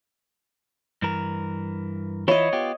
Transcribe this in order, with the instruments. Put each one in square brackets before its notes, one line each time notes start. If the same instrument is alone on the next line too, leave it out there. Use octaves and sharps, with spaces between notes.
[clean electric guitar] G2 E3 A#4
[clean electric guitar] E3 E4 F4 [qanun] C#5 D#5
[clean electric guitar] B3 F4 G4